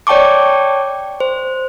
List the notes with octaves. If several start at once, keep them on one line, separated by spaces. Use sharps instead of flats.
C#5 D5 G5 A5 C#6 D6
C5